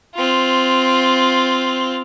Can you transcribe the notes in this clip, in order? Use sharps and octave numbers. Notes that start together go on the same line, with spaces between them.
C4 F4